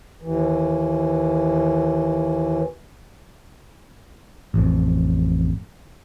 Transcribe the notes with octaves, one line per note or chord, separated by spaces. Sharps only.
D#2 E3
A1 F2